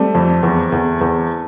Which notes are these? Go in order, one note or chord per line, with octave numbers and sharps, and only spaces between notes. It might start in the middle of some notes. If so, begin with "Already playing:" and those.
Already playing: G3 A3 C4
F2
E2
E2
E2